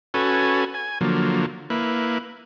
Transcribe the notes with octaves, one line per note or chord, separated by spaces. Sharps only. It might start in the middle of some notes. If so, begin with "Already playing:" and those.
C#4 F#4 A4 B4 G#5
G#5
D3 F3 F#3 A#3
A#3 E4 B4